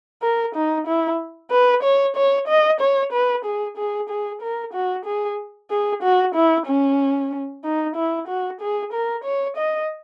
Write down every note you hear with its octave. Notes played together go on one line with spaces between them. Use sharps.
A#4
D#4
E4
B4
C#5
C#5
D#5
C#5
B4
G#4
G#4
G#4
A#4
F#4
G#4
G#4
F#4
E4
C#4
D#4
E4
F#4
G#4
A#4
C#5
D#5